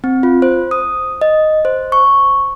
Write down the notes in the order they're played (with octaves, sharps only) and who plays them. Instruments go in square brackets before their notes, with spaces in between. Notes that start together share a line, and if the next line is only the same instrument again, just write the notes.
[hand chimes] C4
F4
C5
D#6
D#5
C5
C#6